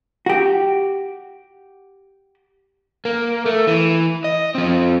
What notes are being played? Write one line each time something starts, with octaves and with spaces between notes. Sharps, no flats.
F#4 G4
A#3
A3
E3
D#5
F3 C4